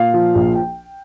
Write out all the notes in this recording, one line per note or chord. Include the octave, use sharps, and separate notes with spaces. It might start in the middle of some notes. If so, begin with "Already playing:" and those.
Already playing: A#2 F5
F3
A#1
G5